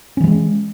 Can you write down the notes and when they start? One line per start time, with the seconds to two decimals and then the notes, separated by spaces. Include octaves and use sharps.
0.17 C#4
0.20 E3
0.24 G3
0.27 G#3